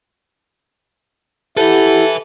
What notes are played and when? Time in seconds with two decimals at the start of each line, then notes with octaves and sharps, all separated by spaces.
1.57 E4 G4 A4 B4 E5 F#5